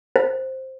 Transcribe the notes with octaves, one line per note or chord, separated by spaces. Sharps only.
C5